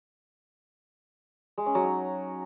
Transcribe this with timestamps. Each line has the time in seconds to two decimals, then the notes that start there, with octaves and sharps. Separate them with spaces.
1.58 G#3
1.66 C#4
1.75 F#3
1.84 D#4